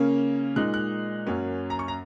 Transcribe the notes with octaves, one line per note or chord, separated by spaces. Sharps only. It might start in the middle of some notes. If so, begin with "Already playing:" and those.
Already playing: C#3 A#3 C#4
A#2 G#3 D#4 F#6
F#6
F#2 F#3 A#3 C#4
A#5
C#6
A#5